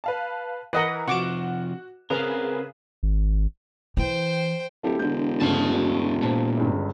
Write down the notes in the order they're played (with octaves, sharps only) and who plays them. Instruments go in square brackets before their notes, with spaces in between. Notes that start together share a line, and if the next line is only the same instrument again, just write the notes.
[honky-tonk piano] B4 F5 A5
[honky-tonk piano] E3 A#4 [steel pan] B4 D#5 F#5
[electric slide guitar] C3 F3 [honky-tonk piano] F#4 E7 [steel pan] C#6 D6
[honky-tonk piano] C#3 G#4 B4 [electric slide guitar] C4 A#4
[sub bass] G#1
[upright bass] E3 [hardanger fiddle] C5 G5
[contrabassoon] D1 [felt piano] A3 E4 G4
[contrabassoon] E1 [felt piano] D3 G6
[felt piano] D2 G2 C#3 [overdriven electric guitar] F#4 A5
[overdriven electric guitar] A#2 [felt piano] C5 A5
[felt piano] G1 C#2 G2